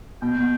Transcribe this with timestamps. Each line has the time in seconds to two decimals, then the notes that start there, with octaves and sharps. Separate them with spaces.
0.22 B2 G5
0.36 B2